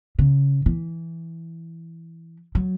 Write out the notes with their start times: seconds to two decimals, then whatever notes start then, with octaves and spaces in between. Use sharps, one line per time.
0.19 C#3
0.66 E3
2.55 F#3